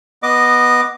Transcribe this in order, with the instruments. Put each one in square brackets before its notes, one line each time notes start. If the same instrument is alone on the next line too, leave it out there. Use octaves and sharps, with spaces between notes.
[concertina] B3 D#5 D6